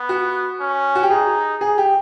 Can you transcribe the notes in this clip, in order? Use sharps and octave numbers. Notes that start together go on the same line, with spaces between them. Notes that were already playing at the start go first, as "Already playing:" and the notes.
Already playing: B3
F#4
C#4
F#4
G4
D#4 G#4
G#4
G4